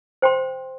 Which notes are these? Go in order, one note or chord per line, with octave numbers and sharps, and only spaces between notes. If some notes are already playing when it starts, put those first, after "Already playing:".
C5 G5 C6